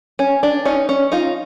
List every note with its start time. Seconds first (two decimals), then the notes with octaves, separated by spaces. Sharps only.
0.19 C#4
0.43 D4
0.65 C#4 D#4
0.89 C#4
1.12 D#4 F4